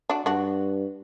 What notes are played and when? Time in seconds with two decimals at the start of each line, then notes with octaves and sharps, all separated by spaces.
0.10 D4 F#4
0.26 G2 D4 F#4